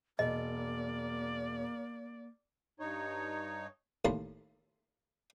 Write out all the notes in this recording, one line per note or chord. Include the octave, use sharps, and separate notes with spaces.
E1 A#3 D5 D#5
G2 D#4 C#5
D#2 A2 A#3 A5 C6